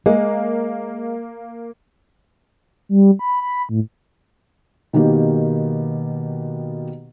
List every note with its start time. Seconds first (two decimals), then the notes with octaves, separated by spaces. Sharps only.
0.06 G#3 A#3
2.89 G3
3.19 B5
3.41 B5
3.69 A2
4.93 B2 D#3 A#3 G4